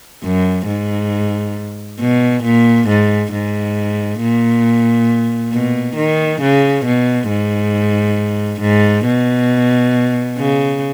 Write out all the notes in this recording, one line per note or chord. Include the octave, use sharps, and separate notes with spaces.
F#2
G#2
B2
A#2
G#2
G#2
A#2
B2
D#3
C#3
B2
G#2
G#2
B2
C#3